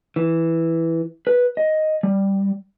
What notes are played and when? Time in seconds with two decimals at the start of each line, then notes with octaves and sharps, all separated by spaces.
0.16 E3
1.27 B4
1.57 D#5
2.03 G3